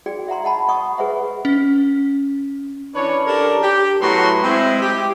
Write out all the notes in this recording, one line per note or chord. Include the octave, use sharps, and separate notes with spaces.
F#4 G#4 D5 G5
E5 F#5 A#5 C6
D#5 F#5 A5 B5
D#5 F#5 C#6 D#6
G#4 B4 C#5 D#5 E5 F#5
C#4
E3 C#4 D4 B4 C#5
D4 G4 A4 A#4
G4
A2 F#3 A3 B3 F#4 C6
G#3 C4 E4
G4